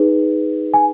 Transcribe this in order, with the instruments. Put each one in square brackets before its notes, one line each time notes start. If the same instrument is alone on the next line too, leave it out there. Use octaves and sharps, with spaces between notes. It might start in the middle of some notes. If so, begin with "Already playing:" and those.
Already playing: [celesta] D#4 G#4 B4
G#5